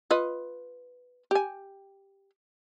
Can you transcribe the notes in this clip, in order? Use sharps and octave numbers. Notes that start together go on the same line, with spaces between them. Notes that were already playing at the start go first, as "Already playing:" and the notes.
F4 B4 D#5
G4 G#5